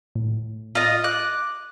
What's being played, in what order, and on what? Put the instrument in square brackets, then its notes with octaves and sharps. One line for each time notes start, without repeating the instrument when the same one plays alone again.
[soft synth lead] A2
[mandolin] F4 D#5
[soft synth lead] D6 [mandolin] F#6